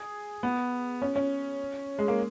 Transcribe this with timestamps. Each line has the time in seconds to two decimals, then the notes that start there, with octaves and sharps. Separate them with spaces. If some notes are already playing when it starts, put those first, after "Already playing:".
Already playing: G#4
0.43 B3
1.02 C#4
1.16 C#4
1.99 G#3
2.08 A#3